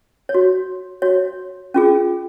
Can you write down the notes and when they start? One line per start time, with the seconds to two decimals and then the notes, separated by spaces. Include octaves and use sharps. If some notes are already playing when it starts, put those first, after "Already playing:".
0.29 C#5
0.34 F#4
1.02 F#4 C#5
1.74 C#4 F4 G#4